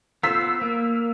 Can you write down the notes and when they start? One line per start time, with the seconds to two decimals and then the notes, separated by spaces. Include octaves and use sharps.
0.23 B3 F4 C5 E6 B6
0.61 A#3